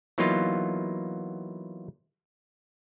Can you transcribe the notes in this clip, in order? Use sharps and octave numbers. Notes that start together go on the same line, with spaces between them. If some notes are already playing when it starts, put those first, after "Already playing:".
E3 F#3 A#3 B3 D#4 F4